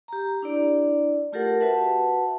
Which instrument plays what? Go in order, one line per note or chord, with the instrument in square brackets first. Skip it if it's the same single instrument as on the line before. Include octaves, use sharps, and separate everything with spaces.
[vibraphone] G4 A#5
D4 E4 D5
A3 F4 G4 A4 A#4 F#5
F#4 B4 E5 F#5 A5